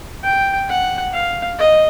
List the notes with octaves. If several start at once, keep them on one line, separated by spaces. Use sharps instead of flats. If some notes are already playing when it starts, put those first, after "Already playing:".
G5
F#5
F5
D#5